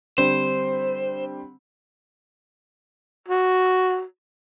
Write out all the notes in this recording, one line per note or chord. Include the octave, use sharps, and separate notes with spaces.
D3 G3 C4 C5
F#4